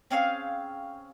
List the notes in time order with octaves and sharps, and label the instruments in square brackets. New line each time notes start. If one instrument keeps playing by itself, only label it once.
[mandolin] C4 C#4 G#4 F5